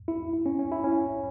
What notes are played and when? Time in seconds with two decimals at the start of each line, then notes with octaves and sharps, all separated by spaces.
0.08 E4
0.33 E4
0.46 C#4
0.59 C#4
0.72 E4
0.84 C#4